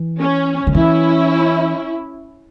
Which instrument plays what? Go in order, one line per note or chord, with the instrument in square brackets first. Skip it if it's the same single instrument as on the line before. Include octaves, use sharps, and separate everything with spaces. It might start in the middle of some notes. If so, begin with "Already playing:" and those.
Already playing: [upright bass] E3
[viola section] C#4
[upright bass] D#3
[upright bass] E3 [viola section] C#4 E4